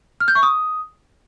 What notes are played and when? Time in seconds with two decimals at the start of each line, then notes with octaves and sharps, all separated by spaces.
0.20 F6
0.28 G6
0.35 C#6
0.43 D#6